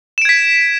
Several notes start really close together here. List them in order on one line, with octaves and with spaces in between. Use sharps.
E7 D7 G#6 B6